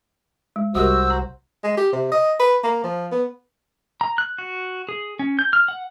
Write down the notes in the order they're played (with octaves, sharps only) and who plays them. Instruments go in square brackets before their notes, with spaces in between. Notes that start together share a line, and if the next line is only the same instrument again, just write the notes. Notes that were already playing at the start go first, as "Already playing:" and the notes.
[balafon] G#3
[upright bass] C2 [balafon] G3 G4 A#4 [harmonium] F#4 C5 [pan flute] E6
[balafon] A#5
[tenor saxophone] G#3
G4
C3
D#5
B4
A#3
F3
B3
[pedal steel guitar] A#5
F#6
F#4
G#4
C#4
G6
F6
F#5